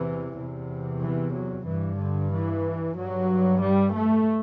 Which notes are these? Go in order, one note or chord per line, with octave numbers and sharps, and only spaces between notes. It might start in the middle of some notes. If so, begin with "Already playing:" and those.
Already playing: E2 C3 E3
E2 C3
E3
F#3
G2 E3
D3
E3
G2 F#3
G3
A3